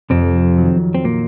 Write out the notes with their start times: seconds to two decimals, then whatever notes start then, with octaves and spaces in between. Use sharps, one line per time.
0.10 F2 C3 C4
0.58 D#3 F#3
0.95 C4
1.04 A#2 A#3